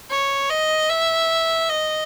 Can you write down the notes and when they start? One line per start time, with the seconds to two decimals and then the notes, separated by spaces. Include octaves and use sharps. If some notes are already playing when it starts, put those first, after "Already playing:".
0.10 C#5
0.50 D#5
0.90 E5
1.69 D#5